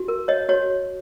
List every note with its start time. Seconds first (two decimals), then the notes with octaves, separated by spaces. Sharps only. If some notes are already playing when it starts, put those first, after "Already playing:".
Already playing: F#4
0.08 A#4
0.28 C#5 D#5
0.49 F#4 C#5